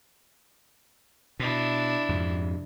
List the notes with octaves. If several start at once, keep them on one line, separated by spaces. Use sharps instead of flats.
B2 D4 E4
F2 G#2 C3